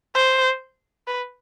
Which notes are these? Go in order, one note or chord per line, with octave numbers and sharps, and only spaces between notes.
C5
B4